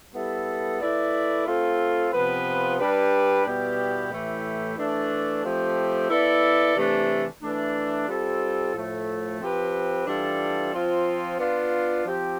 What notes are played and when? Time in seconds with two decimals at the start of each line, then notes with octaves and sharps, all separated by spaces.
0.13 G3 B3 E4 A4
0.79 A3 E4 B4 D5
1.46 A3 C4 F4
2.12 C3 F3 B3 F4 B4
2.78 G3 D4 G4 B4
3.45 B2 G3 B3 E4 G4
4.11 A2 E3 A3 E4 G4
4.77 E3 A3 D4
5.43 F3 A3 C4 G4
6.09 B3 E4 A4 D5
6.76 C3 E3 A3 D4
7.42 E3 A3 D4
8.08 G3 C4 F4 A4
8.74 A2 F3 A3
9.40 F3 C4 G4 B4
10.07 E3 G3 D4 F4 A4
10.73 F3 C4 F4
11.39 B3 D4 F4
12.05 F3 C4 G4